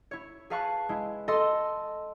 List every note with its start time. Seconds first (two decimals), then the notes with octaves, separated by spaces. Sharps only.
0.11 E4 C#5
0.50 G#4 B4 F5 A5 C#6 F#6
0.89 G#3 E4
1.28 A4 D#5 A5 C6 E6